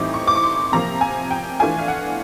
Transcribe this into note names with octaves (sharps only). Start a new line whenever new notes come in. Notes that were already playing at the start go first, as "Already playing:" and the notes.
Already playing: A2 E3 G3 C4 D#4 D6
C#6
D6
C#6
C6
C3 F3 A#3 A#5
G#5
G5
E3 A3 D4 F4 G#5
F5
F#5